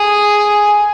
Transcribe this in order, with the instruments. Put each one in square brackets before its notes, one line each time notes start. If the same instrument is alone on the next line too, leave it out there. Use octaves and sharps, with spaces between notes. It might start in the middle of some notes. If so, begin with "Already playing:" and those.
Already playing: [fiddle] G#4